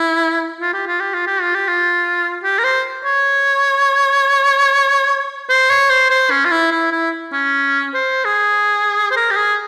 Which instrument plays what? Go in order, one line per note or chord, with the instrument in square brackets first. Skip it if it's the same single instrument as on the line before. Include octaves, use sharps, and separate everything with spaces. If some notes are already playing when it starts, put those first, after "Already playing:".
Already playing: [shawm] E4
F4
G4
F4
G4
F4
G4
F4
G4
F4
G4
A#4
C5
C#5
C5
C#5
C5
C5
C#4
F4
E4
E4
E4
C#4
C5
G#4
C5
A#4
G4
G#4